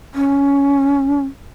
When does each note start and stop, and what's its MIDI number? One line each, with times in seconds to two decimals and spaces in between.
0.14 1.24 61